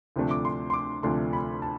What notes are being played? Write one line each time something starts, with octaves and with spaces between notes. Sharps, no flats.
D2 C3 F3 A3 D4
D6
C6
C6
D6
D2 C3 F3 A3 D4 C6
B5
A5